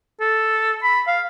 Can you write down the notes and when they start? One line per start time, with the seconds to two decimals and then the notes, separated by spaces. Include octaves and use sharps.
0.20 A4
0.83 B5
1.07 F5